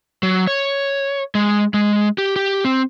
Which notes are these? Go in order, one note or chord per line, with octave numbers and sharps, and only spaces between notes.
F#3
C#5
G#3
G#3
G4
G4
C4